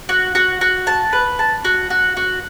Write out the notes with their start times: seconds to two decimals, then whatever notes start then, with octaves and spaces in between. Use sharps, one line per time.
0.09 F#4
0.35 F#4
0.61 F#4
0.87 A5
1.13 B4
1.39 A5
1.65 F#4
1.90 F#4
2.17 F#4